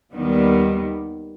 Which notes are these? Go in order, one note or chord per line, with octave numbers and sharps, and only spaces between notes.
D#2 D#3 G3 B3